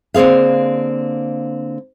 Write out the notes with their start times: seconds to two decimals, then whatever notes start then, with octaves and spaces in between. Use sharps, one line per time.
0.14 D3 A#3 C4 G#4 F5